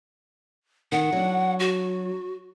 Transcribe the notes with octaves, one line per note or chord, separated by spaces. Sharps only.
D#3 F#5
F#3 D4
F#4